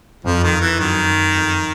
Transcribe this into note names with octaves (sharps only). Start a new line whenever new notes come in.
F2 F3
D#3
E3
F#2 D#3
F2